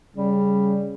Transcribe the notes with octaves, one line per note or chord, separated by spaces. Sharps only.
C#3 G3